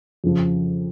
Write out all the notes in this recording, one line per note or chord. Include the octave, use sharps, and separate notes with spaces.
F2 C#3 F3